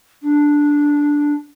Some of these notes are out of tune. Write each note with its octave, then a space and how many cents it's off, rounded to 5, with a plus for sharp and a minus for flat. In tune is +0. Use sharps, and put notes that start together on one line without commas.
D4 -5